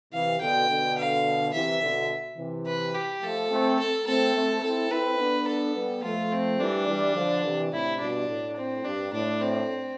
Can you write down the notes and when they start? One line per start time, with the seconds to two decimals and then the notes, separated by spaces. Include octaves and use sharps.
0.13 C3 E3 F5
0.41 B2 D3 G5
0.69 B2 D3
0.98 F5
1.54 C3 E3 E5
1.82 B2 D3
2.38 C3 E3
2.67 B4
2.94 G4
3.22 F3 A3 A4
3.51 A3 C4
3.79 A4
4.07 A3 C4 A4
4.35 A3 C4
4.63 C4 E4 A4
4.91 C4 E4 B4
5.19 B3 D4
5.47 A4
5.75 G3 B3
6.03 F3 A3 F4
6.32 C4
6.60 E3 G3 D4
6.88 E3 G3
7.16 D3 F3
7.44 C3 E3
7.72 A2 C3 E4
8.00 G2 B2 D4
8.29 A2
8.56 C4
8.84 G2 D4
9.13 A2 D4
9.41 C4